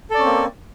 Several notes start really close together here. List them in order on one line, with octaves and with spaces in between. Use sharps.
A4 D5 C#4 C4 A#3